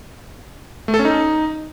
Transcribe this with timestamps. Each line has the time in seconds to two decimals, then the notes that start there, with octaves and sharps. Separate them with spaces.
0.88 A3
0.94 A4
0.99 C#4
1.05 D#4